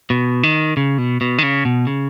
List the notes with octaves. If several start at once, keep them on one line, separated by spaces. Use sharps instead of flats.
B2
D#3
C#3
B2
B2
D#3
C#3
B2
C#3